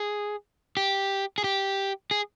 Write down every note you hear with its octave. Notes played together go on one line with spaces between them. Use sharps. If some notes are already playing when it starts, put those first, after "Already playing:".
Already playing: G#4
G4
G#4
G4
G#4